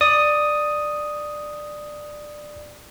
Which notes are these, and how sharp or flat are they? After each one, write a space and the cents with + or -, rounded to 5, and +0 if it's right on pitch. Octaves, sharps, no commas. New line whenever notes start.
D5 +15 D#6 +0